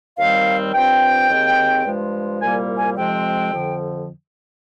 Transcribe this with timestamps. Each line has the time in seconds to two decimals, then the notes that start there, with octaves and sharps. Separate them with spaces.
0.18 D#2 D#3 G3 C4 F5
0.74 G2 F3 C4 G5
1.29 D#2 D#3 G#3 C4
1.85 G2 F3 G#3
2.41 C2 A#2 G3 A#3 G#5
2.78 G#5
2.97 F2 C3 F3 G#3 C4 G5
3.53 F2 D3 F3